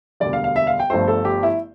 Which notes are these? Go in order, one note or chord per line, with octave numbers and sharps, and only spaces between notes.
E1 D2 D3 G3 D5
F5
F5
E5
F5
G5
G1 G2 F3 A3 C5
A4
G4
E4